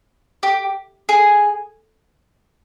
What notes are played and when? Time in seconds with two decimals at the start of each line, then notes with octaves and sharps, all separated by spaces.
0.43 G4
1.09 G#4